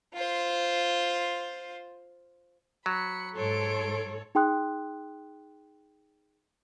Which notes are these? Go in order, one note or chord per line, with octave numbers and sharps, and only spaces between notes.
F4 C5
F#3 B5 C#7
G#2 A4 C#5 C6 D7
D#4 G#4 G5 C6 D#6 F#6